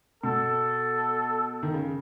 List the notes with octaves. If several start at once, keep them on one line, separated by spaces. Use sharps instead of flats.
B2 A4
D#3
C#3